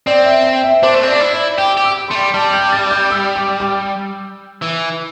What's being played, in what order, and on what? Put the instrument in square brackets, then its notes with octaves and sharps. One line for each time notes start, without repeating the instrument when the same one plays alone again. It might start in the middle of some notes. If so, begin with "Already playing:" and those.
[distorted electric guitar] C4 [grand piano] D5
[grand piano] E5
G5
E5
[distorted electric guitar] D4 [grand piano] C5
[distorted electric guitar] A3
C4
[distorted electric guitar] D4 [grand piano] D5
[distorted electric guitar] E4
[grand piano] D5
[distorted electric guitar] G4 [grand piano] G5
[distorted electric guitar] G4
[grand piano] E6
[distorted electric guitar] A3 [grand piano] C6
[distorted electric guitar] G3
[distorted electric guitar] G3 [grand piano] A5
[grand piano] G6
A6
G6
E6
D6
D6
[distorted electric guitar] E3